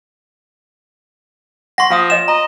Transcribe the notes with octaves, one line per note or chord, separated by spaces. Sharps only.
F#5 C6 C#6 A#6
F3 F4 F5 D#6
C#5 D#5 F5 E7
D#5 A#5